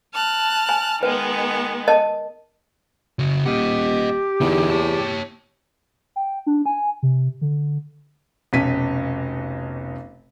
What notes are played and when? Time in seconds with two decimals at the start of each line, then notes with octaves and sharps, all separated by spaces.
0.13 A5 F6 F#6
0.69 G#5
1.03 D#3 G#3 B3 B4
1.88 A#4 D#5 A5
3.19 C#3 F#4
3.46 D#1 G4 D#5 F#5
4.41 E2 D3 D#4
4.70 C#5 A5
6.16 G5
6.47 D4
6.66 G#5
7.03 C3
7.41 D3
8.53 F1 B1 C#4 B6 D#7